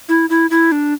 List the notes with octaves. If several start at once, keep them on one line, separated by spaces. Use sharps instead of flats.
E4
E4
E4
D4